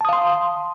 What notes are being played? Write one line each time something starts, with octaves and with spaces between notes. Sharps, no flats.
F5 A5 C6 D#6